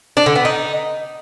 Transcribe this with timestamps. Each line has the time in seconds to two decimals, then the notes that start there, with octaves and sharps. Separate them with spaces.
0.17 D4
0.26 D3
0.35 B3
0.45 D#4